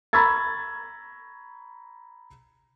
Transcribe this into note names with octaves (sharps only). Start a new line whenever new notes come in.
A#5 B5 C#6 E6 G#6 A6